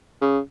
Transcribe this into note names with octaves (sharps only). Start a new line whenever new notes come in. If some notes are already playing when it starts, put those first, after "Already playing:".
C#3